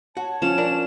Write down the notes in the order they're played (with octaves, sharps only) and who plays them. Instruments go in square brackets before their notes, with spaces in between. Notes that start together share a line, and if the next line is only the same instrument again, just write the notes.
[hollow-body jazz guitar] F#4 [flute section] C#5 A5
[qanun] F3 C#4 [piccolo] E7
[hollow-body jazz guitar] D4 A#4 D5